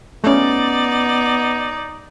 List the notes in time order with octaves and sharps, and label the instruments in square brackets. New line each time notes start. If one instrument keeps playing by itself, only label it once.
[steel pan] A3 C#4 [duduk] B3 [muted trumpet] D#4 [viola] D5